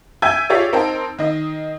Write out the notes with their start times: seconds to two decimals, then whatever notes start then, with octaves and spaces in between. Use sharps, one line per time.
0.22 E5 G5 G#5 E6 G6 G#6
0.49 F4 G4 G#4 C#5 D5 E5
0.73 C4 D#4 A#4 C5 G5 A5
1.19 D#3 D#5